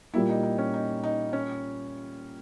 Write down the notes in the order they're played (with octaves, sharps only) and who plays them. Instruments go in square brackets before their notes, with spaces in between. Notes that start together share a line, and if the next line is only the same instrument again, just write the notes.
[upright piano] A#2 G3 A#3 [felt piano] E4
[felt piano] D#4
D#4
C#4
D#4
D#4
C#4